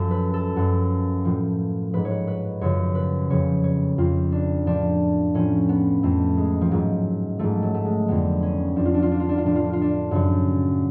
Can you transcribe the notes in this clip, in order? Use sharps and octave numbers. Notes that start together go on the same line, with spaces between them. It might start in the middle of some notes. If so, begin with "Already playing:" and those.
Already playing: F#2 F3 A4
B4
A4
F#2 F3 F#4
A2 F3
G#2 F3 B4
C#5
B4
B4
F#2 C#3 F3 C#5
B4
F2 C#3 F3 C#5
C#5
F2 F3 F4
D4
A2 F3 D4
A2 F3 C#4
B3
F2 F3 A3
G#3
F3
G#2 F3 F#3
G#2 F3 A3
F#3
A3
G#3
F2 D3 F3 B3
C#4
F2 F3 D4
F4
D4
F4
D4
F4
D4
F4
A2 F3 D4
F4
D4
F4
D4
F#2 C#3 F3 F#4